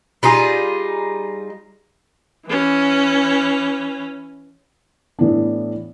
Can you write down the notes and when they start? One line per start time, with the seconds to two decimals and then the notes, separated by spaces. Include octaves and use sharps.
0.23 G3 D#4 F4 G#4
2.47 E3 C#4
5.19 A2 E3 B3 D4